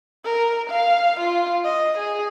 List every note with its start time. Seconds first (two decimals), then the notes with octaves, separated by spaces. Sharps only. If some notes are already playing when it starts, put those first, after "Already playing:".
0.24 A#4
0.70 F5
1.20 F4
1.64 D#5
1.98 G#4